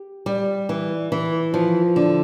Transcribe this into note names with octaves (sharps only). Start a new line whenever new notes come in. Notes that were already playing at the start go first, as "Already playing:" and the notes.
Already playing: G4
G3
E3
E3
F3
D3